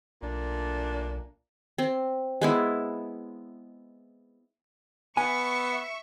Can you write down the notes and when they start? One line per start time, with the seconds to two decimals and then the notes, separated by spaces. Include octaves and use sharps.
0.22 B1 A#2 A3 D4
1.78 C4
2.41 G#3 B3 E4
5.17 B3 E5 G#5 C#6